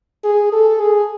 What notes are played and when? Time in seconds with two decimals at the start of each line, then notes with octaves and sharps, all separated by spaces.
0.24 G#4
0.53 A4
0.81 G#4